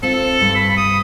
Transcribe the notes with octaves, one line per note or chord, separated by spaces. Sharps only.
C4 F4 A4
G2
B5
D#6